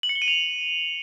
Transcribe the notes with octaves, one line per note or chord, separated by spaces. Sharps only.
F#7
C#7
G7
D#7
F7